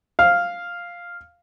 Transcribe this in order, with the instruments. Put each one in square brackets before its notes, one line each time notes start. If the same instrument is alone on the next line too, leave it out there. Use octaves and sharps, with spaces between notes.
[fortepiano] F5